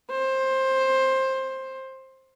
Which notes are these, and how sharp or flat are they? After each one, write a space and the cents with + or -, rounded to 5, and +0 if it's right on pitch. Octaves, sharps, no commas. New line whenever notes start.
C5 +15